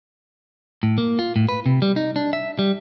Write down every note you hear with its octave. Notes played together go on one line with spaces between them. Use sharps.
A2
A#3
F4
A2
B4
C3
G3
D#4
D4
E5
G3